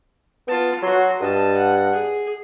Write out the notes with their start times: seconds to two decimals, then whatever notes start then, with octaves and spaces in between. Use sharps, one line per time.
0.48 B3 F4 A5
0.83 F#3 F#4 C6
1.21 G2 D#5 A5
1.57 F#5
1.93 G#4